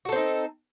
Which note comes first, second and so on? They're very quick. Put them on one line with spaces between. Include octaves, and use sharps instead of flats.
F#4 A4 C4 D#4